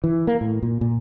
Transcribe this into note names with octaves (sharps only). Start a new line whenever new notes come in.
E3
A#3
A2
A#2
A#2